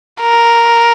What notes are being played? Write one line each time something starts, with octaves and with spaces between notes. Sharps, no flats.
A#4